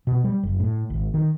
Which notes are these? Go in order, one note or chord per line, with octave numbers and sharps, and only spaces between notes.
B2
G3
F#1
A2
G#1
D#3